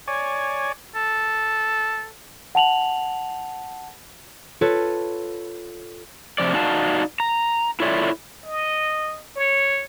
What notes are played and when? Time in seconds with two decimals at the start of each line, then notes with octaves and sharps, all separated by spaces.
0.07 C#5 D5 G#5
0.95 A4
2.55 F#5 A5 F7 F#7
4.61 F4 A4 B4 C#5
6.38 C3 F3 D5
6.54 D#4 F#4 D5 F5 A5
7.20 A#5
7.80 E4 F4 A4 C#5 D5 E5
8.44 D#5
9.36 C#5